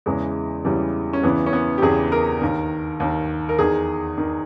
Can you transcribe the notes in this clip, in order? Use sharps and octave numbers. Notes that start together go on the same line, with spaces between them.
E2 C#3 E3 G#3
E2 C#3 E3 G3
C#4
E2 C#3 E3 B3
C#4
B3
G4
E2 C#3 E3 G#4
A#4
D#2 D#3
D#2 D#3
A#4
E2 D#3 G#4
D#3